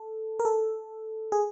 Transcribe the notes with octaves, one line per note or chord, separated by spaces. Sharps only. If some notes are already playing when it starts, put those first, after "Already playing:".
Already playing: A4
A#4
A4
G#4